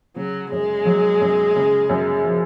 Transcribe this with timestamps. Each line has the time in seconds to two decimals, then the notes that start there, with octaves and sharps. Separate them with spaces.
0.16 C#3 F#3
0.51 F#2 G#3
0.85 F#3
1.21 F#2
1.56 C#3
1.89 F#2
2.24 F3